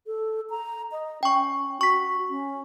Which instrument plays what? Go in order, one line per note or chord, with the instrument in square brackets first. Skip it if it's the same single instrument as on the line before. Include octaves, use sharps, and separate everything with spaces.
[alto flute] A4
A#5
D#5
[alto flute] C#4 [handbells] G5 C#6
[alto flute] F#4 [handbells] C#6 B6
[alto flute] C#4